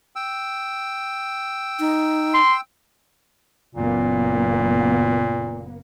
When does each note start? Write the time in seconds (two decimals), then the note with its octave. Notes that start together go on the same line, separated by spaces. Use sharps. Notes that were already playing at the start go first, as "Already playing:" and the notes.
0.16 G5 E6
1.80 D#4
2.34 C6
3.75 F#1 A#2 A#3 B3